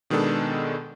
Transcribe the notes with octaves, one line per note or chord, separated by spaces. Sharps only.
B2 D#3 G#3 B3 D4 A4